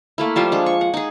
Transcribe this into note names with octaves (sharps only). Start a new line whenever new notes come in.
A3 A#3 E4
F3 G3 F4 C5
G#3 D4
C#6
F#5
D#4 G#4